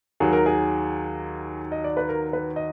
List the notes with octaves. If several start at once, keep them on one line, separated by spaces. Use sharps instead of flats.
D#2 D#3 F#3 G#4
A#4
G#4
D#5
D5
B4
A#4
B4
D#5